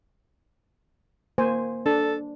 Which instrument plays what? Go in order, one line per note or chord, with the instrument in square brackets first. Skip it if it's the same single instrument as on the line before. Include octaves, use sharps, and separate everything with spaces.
[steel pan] A#3 C5 G#5
[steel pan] D4 [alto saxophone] A4